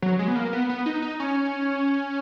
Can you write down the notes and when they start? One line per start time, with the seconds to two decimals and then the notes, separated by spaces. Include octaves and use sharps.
0.02 F#3
0.19 G#3
0.28 B3
0.36 A#3
0.53 B3
0.69 B3
0.86 D#4
1.02 D#4
1.20 C#4